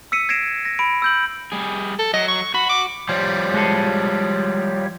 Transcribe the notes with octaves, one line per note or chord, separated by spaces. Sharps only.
E6 B6 C#7 D#7
G#6 A#6 C7 D7 E7
A#6
B5 D7
E6 G6 F#7
G3 G#4
A4
F#3 D#5
C#6
F#4 B5
D6
F3 G3 C#5
G#3 G#4 A4